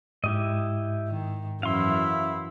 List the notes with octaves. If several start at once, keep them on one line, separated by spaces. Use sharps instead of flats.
G#2 E4 G4 D#5
D#3
F#2 E3 E4 F5 C6